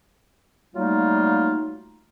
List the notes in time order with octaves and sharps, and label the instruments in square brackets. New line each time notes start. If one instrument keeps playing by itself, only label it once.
[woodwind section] F#3 G3 A3 A#3 D#4 F4